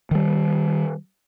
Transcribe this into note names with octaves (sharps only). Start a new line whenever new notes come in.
D#3 G3